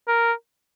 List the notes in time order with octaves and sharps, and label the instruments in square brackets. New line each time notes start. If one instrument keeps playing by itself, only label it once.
[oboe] A#4